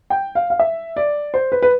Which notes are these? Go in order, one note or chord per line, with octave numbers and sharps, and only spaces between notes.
G5
F5
F5
E5
D5
C5
B4
B4